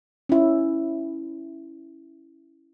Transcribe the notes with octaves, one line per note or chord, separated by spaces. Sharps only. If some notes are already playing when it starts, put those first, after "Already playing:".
C#4 E4